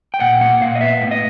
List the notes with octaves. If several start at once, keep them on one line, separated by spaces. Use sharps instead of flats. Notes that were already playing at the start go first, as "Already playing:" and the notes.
G5
A#2 F#5
A#3 F#5
A#2 F5
D#5
B3 E5
A2
D#5